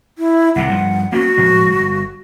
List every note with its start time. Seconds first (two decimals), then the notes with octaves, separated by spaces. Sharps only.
0.18 E4
0.56 C2 C3 D#3 F#5
0.69 G2 F3
1.12 A#3 B3 C#4 F#4
1.38 A2 F3 G#3
1.68 G1